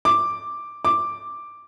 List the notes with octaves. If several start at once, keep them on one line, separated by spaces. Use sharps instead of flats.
D6
D6